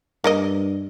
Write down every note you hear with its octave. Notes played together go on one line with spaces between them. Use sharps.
G2 A#3 A#4 D#5